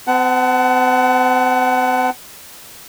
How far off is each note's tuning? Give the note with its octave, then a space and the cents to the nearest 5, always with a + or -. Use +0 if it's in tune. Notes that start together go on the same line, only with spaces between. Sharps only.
C4 -40 F#5 +20 A5 +0